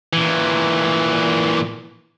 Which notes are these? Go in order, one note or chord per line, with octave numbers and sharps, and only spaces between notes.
A#2 E3